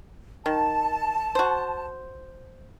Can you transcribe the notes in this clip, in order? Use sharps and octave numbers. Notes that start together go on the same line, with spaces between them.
D#3 A5
F#4 C5